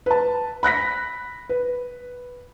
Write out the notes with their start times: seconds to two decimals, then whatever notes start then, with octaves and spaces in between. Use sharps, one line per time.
0.06 B4 A5
0.63 B5 F#6 A#6 B6
1.49 B4